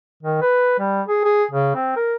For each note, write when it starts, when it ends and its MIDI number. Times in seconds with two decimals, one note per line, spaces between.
0.23 0.41 51
0.41 0.77 71
0.79 1.02 55
1.08 1.20 68
1.24 1.44 68
1.51 1.72 49
1.75 1.94 60
1.96 2.15 70